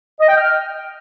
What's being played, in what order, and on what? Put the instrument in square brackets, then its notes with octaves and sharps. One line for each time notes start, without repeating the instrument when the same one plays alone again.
[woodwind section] D#5
G5
F6